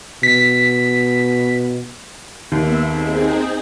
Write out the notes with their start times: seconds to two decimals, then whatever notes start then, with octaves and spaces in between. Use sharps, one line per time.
0.23 B2 B6
2.52 D#2 A#3 B3 E5
2.86 C4 D#4 G#4